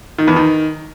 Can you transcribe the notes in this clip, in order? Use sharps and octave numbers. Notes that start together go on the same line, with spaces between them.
D#3
E2
D#3